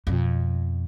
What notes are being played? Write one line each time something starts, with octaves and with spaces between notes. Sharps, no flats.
F2 B2